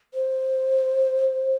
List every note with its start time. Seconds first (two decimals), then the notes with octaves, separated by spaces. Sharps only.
0.14 C5